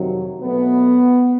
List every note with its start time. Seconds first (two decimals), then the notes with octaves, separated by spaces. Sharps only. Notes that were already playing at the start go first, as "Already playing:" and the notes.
Already playing: F2 C3 D#3 F#3
0.41 B2 F#3 A3 B3